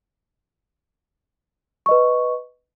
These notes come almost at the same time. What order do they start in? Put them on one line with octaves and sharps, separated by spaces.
C#6 D#5 B4